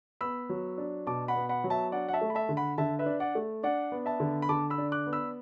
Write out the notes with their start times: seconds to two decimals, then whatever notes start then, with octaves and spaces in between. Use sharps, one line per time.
0.21 B3 B5 E6
0.49 F#3
0.78 D4
1.07 B2 A5 D6
1.28 F#5 B5
1.36 B3
1.49 F#5 B5
1.64 F#3
1.70 E5 A5
1.92 D4 D5 F#5
2.08 F#5
2.13 E5 A5
2.21 A3
2.30 B5
2.35 E5 A5
2.49 D3
2.57 F#5 B5
2.78 D3 E5 A5
2.99 B4 E5
3.06 D4
3.20 D5 F#5
3.35 A3
3.63 D4 D5 F#5
3.92 B3
4.06 E5 A5
4.20 D3
4.42 B5
4.49 D3 A5 D6
4.70 B5 E6
4.78 D4
4.92 D6 F#6
5.06 B3
5.13 B5 E6